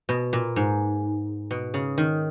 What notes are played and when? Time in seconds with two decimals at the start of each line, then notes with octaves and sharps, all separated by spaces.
0.09 B2
0.33 A#2
0.56 G#2
1.51 B2
1.74 C#3
1.98 D#3